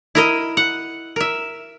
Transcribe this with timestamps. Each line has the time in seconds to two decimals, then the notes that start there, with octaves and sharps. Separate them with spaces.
0.15 E4 A#4 D#5
0.57 F#5
1.16 A#4 E5